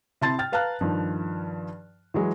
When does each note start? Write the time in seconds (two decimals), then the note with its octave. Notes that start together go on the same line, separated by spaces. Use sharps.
0.21 C3 E4 A5 C6 A6
0.39 G5 F6 A6
0.52 B4 F5 A5 A#5 F6 F#6
0.81 G2 D#3 F3
2.14 E3 F#3 G#3